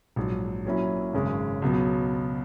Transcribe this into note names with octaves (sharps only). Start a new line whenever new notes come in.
A#1 G#2 F#3
A#2 F#3 C#4 E4
G#1 F#2 C#3 G#3
C#2 B2 F#3 B3